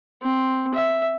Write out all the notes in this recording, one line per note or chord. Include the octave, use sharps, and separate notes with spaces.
C4
E5